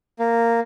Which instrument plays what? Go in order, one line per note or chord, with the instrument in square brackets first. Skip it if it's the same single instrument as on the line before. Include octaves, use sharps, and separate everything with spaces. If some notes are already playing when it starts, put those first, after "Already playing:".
[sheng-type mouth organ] A#3